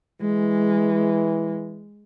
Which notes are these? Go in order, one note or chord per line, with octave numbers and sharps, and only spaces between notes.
E3 G#3